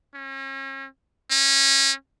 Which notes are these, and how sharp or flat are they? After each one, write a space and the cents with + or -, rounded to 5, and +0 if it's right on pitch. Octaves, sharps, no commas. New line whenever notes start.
C#4 -40
C#4 -25